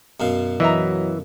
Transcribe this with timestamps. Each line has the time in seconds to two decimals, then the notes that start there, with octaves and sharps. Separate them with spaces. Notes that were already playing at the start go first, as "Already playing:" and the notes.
0.20 F#2 B2 F5
0.60 E3 F#3 D#5 E5 A#5